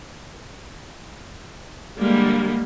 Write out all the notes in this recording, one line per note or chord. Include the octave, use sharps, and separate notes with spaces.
D3 G3 G#3 A#3